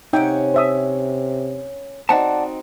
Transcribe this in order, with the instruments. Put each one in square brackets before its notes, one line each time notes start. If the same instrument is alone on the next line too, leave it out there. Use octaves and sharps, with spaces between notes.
[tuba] C3 [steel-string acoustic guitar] C#4 C#5 F#5 [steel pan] D#4 E5 G5
[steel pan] C5 E5 D#6
[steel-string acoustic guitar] C4 D#4 F#4 [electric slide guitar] D5 F#5 A5